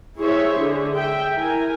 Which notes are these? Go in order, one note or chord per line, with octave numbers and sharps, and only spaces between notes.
E4 G#4 C5 C#5 E5
D3 G#4
E5 G5
E4 A#4 G#5